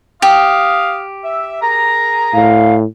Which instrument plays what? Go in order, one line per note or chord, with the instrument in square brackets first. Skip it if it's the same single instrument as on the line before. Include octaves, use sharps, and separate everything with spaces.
[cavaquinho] G4 [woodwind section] F5 D#6
[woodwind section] E5
G#4 A#4 A#5
[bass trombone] A2 [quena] F5